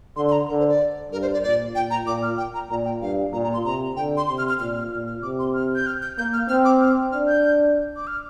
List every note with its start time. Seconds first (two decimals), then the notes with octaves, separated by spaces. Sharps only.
0.16 D3 C6
0.28 C6
0.32 A#5
0.48 D3 A#4
0.59 C5
0.69 D5
1.12 G2 A#4
1.22 C5
1.33 D5
1.43 A#2 D5
1.75 A#2 G5
1.91 A#5
2.06 A#2 D6
2.23 F6
2.38 G5
2.54 A#5
2.70 A#2 A#5
2.85 G5
3.02 G2 F5
3.33 A#2 A#5
3.43 A#5
3.54 C6
3.65 C3 A#5
3.96 D3 G5
4.17 C6
4.27 C3 C6
4.38 F6
4.48 F6
4.59 A#2 F6
4.76 F6
4.91 A#2 F6
5.07 F6
5.22 C3 D6
5.39 C6
5.54 F6
5.75 G6
5.87 F6
6.02 G6
6.18 A#3 G6
6.33 F6
6.49 C4 F6
6.65 D6
6.81 F6
7.12 D4 F6
7.28 G6
7.96 D6
8.07 F6